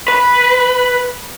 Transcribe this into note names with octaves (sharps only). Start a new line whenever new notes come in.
B4